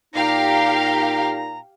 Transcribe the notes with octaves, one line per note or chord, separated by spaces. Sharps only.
A#2 D#4 G4 F5 A#5